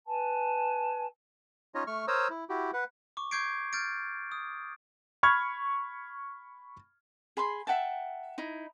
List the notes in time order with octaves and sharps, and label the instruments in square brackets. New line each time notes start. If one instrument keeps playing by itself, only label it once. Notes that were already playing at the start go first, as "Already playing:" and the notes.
[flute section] B4 G#5 A5
[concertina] C#4 D#4 F4 C#5 D#5
A3 C#6 F6
A#4 C5 C#5 A#5 D#6 E6
E4
E4 F#4 G4
B4 F#5
[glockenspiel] C#6 D6
C#6 D6 G6 G#6 C7 D7
F6 G6 A6 D7
D#6
[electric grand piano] B5 C#6 F6 G#6
[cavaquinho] G#4 B5 C6
E5 F#5 G5 A5
D#4 E4